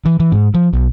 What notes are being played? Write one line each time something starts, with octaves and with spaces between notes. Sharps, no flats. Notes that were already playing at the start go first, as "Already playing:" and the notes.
E3
E3
G#2
F3
B1